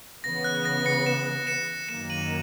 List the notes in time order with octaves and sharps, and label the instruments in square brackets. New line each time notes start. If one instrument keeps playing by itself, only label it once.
[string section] C#3 E3 B3 [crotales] A#6
[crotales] F#6
A#6
A#6 C#7
C#7 E7
C#7 E7
[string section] F#2 D#3 F#3 A#3 [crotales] C#7 E7
[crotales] D#7 F#7